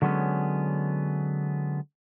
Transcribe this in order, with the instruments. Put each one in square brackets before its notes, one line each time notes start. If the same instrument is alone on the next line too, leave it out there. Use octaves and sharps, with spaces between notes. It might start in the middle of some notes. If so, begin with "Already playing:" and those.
[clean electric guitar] D3 F#3 G#3 B3 C#4